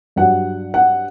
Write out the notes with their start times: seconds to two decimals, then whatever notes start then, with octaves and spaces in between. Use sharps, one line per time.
0.16 G2 F#3 F#5
0.74 F#5